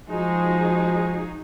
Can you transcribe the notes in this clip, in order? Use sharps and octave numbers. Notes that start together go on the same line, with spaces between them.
F3 G#3 D#4 F#4 G#4